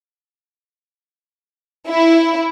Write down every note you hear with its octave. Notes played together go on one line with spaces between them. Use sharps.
E4